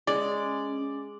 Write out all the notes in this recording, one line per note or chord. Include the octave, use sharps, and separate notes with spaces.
G#3 C#4 D5